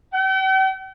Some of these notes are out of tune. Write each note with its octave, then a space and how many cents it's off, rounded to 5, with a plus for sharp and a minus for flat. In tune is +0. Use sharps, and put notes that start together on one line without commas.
G5 -45